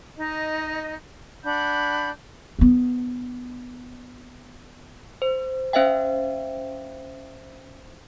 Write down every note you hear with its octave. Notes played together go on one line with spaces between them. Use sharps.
D#4 D#5
D4 F#5 B5 G6
B3 D4
C5
C#4 C5 E5 F5 G5